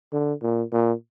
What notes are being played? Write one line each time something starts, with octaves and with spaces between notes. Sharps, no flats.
D3
A#2
A#2